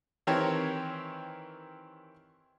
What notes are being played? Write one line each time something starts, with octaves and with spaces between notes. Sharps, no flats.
D#3 E3 C4 G4 A#4 C#5